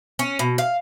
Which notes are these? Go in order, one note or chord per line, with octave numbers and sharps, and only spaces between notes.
C#4
B2
F5